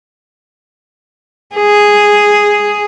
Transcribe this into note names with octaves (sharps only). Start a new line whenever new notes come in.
G#4